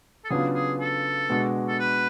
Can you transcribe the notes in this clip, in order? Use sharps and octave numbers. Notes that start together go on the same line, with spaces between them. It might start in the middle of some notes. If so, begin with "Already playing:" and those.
A4
C#3 F#3 B3 D4 F4 G#4
G#4
A4
B2 G#3 D4 F#4
A4
B4